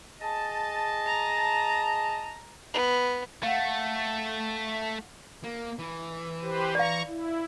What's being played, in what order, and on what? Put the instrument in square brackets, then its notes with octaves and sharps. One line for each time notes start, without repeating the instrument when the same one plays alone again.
[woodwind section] G#4 D#5 A5
[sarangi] A#5
[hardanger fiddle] B3
[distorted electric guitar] A3 [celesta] F5 F#5
[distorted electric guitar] A#3
E3
[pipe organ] G4 B4 C5
[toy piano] D5 F5 [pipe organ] A#5 C#6
[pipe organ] E4